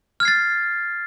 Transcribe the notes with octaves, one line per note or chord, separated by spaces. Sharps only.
F6 G#6 A6 C7